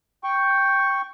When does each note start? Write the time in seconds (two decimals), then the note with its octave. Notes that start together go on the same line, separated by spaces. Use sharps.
0.24 G5 C#6